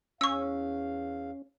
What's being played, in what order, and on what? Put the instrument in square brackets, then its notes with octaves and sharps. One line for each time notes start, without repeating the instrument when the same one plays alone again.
[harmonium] E2 F5 [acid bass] C#4 [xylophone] C#6 E6